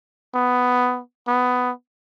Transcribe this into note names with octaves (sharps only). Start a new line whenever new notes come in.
B3
B3